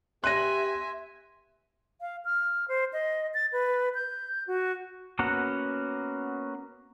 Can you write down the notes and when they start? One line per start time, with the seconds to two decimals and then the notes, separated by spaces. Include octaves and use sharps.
0.24 B3 G4 E5 G#5 C6 F#6 A#6 D#7
2.01 F5
2.25 F6
2.68 C5
2.93 D#5
3.34 A6
3.52 B4
3.95 G6
4.47 F#4
5.19 A#3 B3 C#4 F#4 F#5